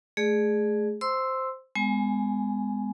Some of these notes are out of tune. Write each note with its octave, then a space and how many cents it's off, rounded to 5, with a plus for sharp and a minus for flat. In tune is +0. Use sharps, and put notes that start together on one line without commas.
A3 -25 G#4 +0 D5 +30
C5 +0 C6 +0 E6 +0
G#3 -10 B3 +25 G#5 +10